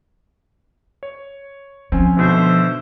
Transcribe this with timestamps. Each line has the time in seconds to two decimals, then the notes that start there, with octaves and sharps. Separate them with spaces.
1.03 C#5
1.92 F3 C4 C#4 G#5
2.17 G#2 B2 D3 C5 E5 C6